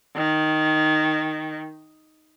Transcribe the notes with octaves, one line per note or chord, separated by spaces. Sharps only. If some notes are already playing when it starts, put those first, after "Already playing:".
D#3